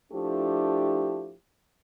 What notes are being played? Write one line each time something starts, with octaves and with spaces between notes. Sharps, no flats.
F3 A3 D4 E4 G4